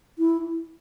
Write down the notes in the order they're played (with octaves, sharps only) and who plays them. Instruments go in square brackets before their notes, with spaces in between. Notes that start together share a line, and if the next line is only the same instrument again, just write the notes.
[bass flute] E4